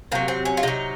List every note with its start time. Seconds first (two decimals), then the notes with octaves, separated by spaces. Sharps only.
0.12 C3 F#3 A#3
0.28 C4
0.45 C#4
0.57 F4
0.63 C3 F#3 D#4